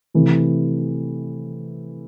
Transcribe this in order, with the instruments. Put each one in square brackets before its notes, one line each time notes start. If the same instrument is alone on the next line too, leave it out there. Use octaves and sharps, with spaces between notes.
[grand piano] C3 E3 A3